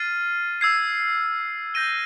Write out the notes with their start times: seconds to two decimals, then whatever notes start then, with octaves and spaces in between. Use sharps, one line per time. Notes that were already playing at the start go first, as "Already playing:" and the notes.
Already playing: F6 A6 C7 D#7
0.61 E6 G#6 C7
1.74 G6 A#6 D#7 G7